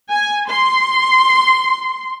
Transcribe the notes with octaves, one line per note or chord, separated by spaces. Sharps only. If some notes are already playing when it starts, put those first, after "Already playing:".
G#5
C6